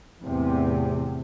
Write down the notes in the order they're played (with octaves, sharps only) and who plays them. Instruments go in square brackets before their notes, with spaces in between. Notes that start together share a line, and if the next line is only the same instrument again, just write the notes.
[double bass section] E2 A2 C3